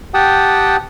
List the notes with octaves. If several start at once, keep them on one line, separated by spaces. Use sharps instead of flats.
G4 F#5 G5 A5 D#6